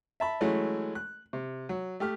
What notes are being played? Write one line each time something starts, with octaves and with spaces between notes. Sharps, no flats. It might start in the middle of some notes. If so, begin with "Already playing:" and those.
E5 A5 B5
E3 F#3 G#3 A3 C#4
F#6
C3
F#3
A3 G4 F6